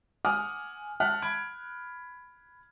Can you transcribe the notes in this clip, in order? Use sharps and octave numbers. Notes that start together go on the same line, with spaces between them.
F#5 G#5 D6 D#6 F6
E5 F#5 A5 F6 F#6
B5 G#6 D7